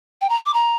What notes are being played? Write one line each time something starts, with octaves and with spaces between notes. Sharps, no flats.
G5
A#5
D6
A#5